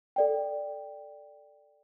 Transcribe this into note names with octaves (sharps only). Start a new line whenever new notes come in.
A4 D5 G5